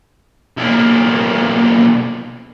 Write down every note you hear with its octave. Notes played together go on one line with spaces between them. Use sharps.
B1 A#3